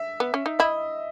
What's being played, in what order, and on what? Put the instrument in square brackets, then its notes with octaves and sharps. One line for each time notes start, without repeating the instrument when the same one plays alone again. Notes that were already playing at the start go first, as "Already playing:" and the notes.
Already playing: [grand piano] E5
[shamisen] B3
C#4
D#4
[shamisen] E4 [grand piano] D#5